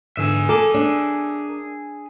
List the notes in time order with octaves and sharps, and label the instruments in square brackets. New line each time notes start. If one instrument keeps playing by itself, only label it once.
[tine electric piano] G#2 D3 E3 [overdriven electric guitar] G#4 E5
[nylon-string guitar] A4 [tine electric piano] A#4 A#5 D6
[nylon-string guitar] D4